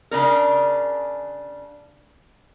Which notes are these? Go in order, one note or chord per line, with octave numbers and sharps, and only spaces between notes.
C#3 D4 A#4